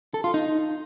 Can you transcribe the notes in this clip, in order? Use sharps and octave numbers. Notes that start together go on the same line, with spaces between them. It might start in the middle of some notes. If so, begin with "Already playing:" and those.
A4
F4
D#4